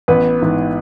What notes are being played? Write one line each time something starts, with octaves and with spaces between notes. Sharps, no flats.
A1 B3 B4
G#2 E3 B3